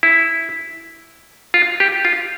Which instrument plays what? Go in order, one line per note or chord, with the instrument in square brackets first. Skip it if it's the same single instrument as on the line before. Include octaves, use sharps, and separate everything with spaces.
[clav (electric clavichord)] E4
F4
G4
F4